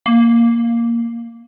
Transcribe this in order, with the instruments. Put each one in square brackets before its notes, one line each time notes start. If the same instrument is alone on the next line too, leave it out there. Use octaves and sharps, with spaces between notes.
[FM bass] A#3